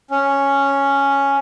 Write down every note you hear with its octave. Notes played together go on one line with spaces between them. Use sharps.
C#4